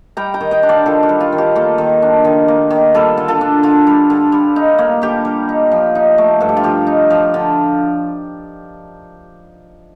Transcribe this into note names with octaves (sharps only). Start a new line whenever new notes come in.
G3 G5 A#5
G5 A#5
D#3
D#5 G5
D4
D5 F5
D#3 F4 A4
G4
G3
F4
D#3
G4
A#3 F4 A4
D#3
D4
D#3
A#3
D#3
G3 F4 A4
D3
F4 A4
D4
D3 F4
G3
D3
G3
D#4
A#3
D3 G4
G3
D#4
F3
D#4
A3
G2 A4
G4
F4
F3 G4
D#4
F3
D3